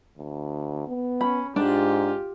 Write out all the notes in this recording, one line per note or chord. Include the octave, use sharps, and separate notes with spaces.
D2
B3
C#4 B5
G#2 D4 F4 G4